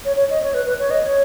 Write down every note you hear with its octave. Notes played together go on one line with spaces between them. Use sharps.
C#5
C#5
D#5
C#5
B4
B4
C#5
D#5
C#5